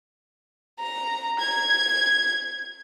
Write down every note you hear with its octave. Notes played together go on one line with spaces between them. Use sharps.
A#5
G#6